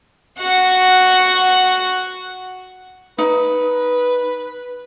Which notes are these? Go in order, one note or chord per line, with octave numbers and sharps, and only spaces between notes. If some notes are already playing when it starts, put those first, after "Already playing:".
F#4 F#5
D#4 B4